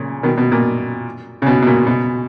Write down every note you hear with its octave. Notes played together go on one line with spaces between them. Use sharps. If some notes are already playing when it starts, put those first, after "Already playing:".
Already playing: A#2 C#3
B2 D#3
B2
A#2
C#3
B2
B2
A#2
B2